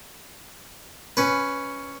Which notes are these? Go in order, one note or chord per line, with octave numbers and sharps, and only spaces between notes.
C#4 B4